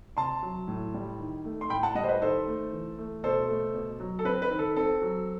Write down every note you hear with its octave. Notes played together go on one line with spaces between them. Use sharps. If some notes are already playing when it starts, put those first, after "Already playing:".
C3 A5 C6
F#3
A2
G3
D#3
A3
C6
A2 G5 B5
F#5 A5
G3 D#5 F#5
C5
B4 D#5
D#3 A4 C5
A3
E3
A3
B2 A4 C5
A3
B2
F#3
A4
C4 B4
B4
D#3
A4
C4 A4
F#3